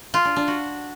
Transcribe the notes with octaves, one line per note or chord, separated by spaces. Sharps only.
F4
D4
D4
F#4